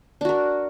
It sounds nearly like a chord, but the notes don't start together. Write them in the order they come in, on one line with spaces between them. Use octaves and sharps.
D4 F#4 A#4